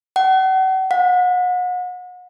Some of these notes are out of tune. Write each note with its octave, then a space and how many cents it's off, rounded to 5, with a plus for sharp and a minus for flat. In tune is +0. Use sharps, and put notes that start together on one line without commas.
F#5 +40
F#5 -35